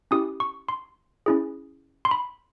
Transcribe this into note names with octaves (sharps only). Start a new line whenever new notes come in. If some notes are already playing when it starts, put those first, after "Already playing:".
C#4 E4 G4 D#6
C#6
C6
C#4 E4 G#4
C6
B5